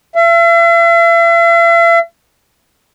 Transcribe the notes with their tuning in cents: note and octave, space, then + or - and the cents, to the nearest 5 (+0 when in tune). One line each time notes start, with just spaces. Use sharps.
E5 +45